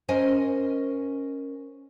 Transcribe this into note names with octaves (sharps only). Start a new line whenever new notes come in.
C#4 A#4 C5 D#5 G#5